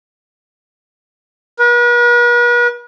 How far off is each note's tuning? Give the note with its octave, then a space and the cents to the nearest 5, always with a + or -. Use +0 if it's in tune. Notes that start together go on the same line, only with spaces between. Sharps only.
B4 -45